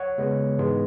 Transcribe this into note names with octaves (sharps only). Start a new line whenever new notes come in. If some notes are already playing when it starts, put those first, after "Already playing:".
Already playing: C#5 F#5
C#3 G#3 B3
G#2 E3 G#3 B3